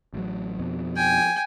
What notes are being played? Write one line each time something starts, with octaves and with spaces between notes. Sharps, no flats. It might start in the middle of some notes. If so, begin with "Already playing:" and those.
A1 F#3
F2 B2
G5 G#5